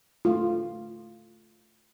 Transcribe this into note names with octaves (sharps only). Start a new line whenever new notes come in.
A3 F4